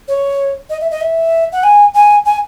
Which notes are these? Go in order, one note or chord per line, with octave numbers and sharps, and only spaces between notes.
C#5
D#5
E5
D#5
E5
F#5
G#5
G#5
G#5